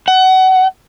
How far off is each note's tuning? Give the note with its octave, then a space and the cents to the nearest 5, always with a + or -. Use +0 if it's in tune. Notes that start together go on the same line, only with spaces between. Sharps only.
F#5 +25